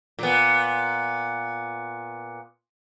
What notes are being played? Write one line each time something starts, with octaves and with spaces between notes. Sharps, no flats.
A#2 B3